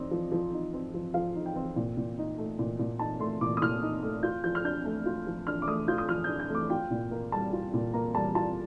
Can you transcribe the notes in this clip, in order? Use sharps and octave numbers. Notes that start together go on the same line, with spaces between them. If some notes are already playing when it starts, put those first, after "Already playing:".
Already playing: C4 D#4 D5
F3
F3
D#4
C4
F3
F3 F5
D#4
G5
C4
A#2
A#2
D#4
A3
A#2
A#2
D#4 A5
A3 C6
A#2 D6
D#6
A#2 F6
D#4
A3
F4 G6
F3 G6
F6
D4 G6
A3
F4
F3
D4 F6
D6
A3 D#6
F4 G6
D#6
F3 F6
D4 G6
G6
A3 D6
F4 G5
A#2
A#3
G3 A5
F4
A#2
A#3 A#5
G3 A5
F4 A5